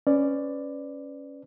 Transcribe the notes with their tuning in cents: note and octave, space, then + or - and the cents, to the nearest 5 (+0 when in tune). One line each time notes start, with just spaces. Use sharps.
C#4 +0 B4 +20 D5 +10